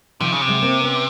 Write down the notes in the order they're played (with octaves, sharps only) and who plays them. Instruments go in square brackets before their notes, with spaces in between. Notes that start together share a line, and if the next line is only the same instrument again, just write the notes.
[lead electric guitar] C3 [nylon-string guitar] D#3 F3
[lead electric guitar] C#3
C3
[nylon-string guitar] F#3 G#3
A#3 C4
B3 C#4